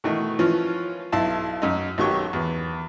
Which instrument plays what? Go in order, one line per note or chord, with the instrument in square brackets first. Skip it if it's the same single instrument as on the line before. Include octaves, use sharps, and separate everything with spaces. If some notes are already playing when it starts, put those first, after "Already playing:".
[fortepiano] B2 D#3 E3 A3
E3 F3 C#4 F4
B1 E4 F5 A5
F#2 D#4
B1 D#3 F#3 G4 C#6
E2